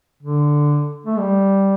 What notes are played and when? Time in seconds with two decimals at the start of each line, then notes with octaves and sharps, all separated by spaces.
0.23 D3
1.06 A3
1.18 G3